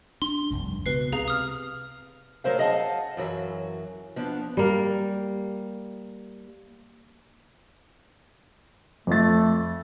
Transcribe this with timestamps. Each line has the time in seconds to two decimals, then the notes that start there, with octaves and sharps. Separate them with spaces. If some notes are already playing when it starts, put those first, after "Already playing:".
0.22 D4 C6
0.50 F1 C2 G2
0.86 C#2 B2 B4 C7
1.12 C3 G#4 F5 A#5
1.28 D#6 F6
2.44 A2 F#3 A#4 C5 F5
2.59 G#4 D#5 F5 F#5 G#5 A5
3.17 F#2 E3 F#3
4.16 F3 B3 D4
4.57 G3 A#3
9.07 F2 A3 A6